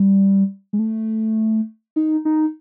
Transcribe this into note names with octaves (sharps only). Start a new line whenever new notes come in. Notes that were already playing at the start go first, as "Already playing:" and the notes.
Already playing: G3
G#3
A3
D#4
D#4